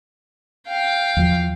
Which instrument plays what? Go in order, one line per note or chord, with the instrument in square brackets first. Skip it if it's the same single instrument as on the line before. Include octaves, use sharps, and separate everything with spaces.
[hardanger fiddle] F5 G5
[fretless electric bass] E2 F3